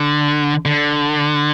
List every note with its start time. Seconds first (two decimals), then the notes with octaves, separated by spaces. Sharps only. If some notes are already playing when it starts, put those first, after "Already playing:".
Already playing: D3
0.65 D3